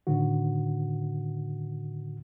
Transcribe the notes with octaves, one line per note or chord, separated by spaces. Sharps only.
A2 D3 D#3 F#4